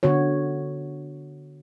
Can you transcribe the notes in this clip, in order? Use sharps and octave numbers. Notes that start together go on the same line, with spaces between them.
D3 B3 F#4 C#5